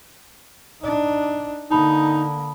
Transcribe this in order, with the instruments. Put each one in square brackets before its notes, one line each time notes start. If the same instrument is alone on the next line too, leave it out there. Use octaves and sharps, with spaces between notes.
[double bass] D4 D#4
[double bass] D3 A#3 [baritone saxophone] D#4 [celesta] A5 B5 D#6